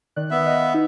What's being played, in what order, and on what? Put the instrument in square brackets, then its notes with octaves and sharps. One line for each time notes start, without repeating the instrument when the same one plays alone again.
[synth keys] D#3 D5 F#6
[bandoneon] B3 E5
[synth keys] D#5 F5 F#6
D#4